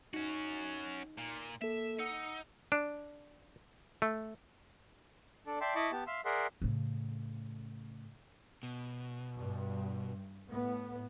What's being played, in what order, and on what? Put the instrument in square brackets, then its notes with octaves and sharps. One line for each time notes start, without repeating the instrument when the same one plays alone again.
[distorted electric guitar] C#4 F#4 [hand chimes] D#4
[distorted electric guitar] A#2
[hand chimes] A#3 A4 [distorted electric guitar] E5
[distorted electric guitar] D#4 [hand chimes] F#5 E6 C#7
[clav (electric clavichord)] D4
A3
[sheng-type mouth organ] D4 A4 D5
D5 E5 G5 A5 C6
E4 D#5 A5 B5 C#6 D6
B3 G4 A5
E5 F5 C6 E6
G#4 A#4 D5 E5 F#5 C6
[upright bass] A2 C#3
[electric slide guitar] B2
[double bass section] G2
A2 B3